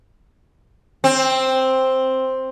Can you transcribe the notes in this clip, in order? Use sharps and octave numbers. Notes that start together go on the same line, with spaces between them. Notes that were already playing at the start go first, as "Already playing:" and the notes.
C4